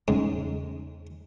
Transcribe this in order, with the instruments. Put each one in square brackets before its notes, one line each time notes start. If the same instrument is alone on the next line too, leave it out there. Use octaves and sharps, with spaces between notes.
[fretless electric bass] E2 C#3 C#4 [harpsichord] G#2